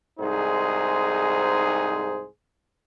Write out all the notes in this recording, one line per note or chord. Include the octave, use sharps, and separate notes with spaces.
C2 G#2 D#4 G#4 C5